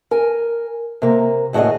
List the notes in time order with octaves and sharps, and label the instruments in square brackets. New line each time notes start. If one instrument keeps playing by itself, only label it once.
[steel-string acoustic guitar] A#4 G#5
C3 A#3
D#2 A2 F#4 G#4 D#5